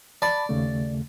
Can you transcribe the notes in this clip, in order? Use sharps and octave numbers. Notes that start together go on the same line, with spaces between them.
D5 A5 B5
D#2 C#3 A3